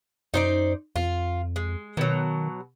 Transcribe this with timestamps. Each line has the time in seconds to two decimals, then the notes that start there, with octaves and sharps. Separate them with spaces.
0.34 F#2 D#4 C5 D5
0.96 F2 F4
1.56 G#3
1.97 B2 D#3 F#3